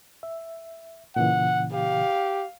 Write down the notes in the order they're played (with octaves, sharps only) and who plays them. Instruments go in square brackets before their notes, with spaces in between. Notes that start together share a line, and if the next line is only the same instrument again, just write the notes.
[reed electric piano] E5
[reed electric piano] A#2 C#3 E3 [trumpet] F#5
[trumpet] G4 [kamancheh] F5